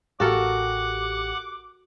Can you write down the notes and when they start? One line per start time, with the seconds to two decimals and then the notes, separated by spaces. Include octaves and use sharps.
0.20 A1 F#4 G4 A4 A#4 F#5 D6